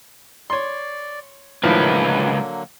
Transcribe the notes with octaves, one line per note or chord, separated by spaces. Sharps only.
C#5 D5 C6
C#2 A2 D3 D#3 F3 F#3 A#3 B4